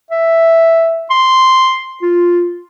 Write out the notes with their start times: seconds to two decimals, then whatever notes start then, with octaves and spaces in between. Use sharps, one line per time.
0.11 E5
1.10 C6
2.02 F4